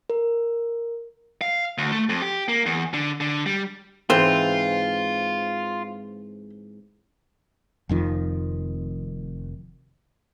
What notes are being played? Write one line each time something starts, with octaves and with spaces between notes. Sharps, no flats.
A#4
F5
D2
A3
F2
G4
A#3
E2
D3
D3
G3
G#2 E3 C4 F4 C5
F1 F2 D#3 F3